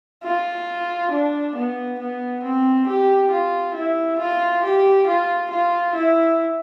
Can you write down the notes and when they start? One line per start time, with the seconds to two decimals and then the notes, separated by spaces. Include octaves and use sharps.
0.23 F4
1.11 D4
1.55 B3
1.99 B3
2.43 C4
2.87 G4
3.31 F4
3.74 E4
4.19 F4
4.63 G4
5.06 F4
5.51 F4
5.95 E4